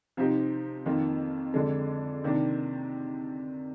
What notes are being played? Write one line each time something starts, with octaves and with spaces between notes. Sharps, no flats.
C3 F3 C4 D#4 G4
F2 D#3 A#3 F4
F2 D3 G#3
C3 D#3 A#3 D4